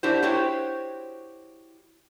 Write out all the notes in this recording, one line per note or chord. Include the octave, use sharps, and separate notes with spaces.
D4 E4 F#4 G4 C5
E4 F#4 G4 C5 C#5